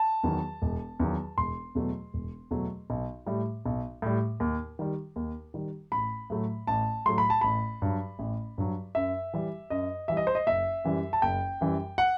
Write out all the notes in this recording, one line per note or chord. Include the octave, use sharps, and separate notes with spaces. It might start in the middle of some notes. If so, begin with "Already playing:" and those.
Already playing: A5
E2 D#3 F#3
E1
E2 D#3 F#3
E1 C6
E2 B2 F#3 A3
E1
E2 B2 F#3 A3
B1
A2 G3
B1
A2 G3
D#2
D#3 G3
D#2
D#3 G3
A1 B5
A2 F#3 A3
A1 A5
A2 F#3 A3 C6
B5
A5
A1 B5
G2 F#3
A1
G2 F#3
F#2 E5
E3 G3
F#2 D#5
E3 G3 E5
D#5
C5
D#5
F#1 E5
F#2 E3 G3
A5
F#1 G5
F#2 E3 G3
F#5